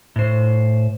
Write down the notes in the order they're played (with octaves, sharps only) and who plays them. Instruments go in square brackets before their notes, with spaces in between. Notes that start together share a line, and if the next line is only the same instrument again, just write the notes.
[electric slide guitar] A2 C5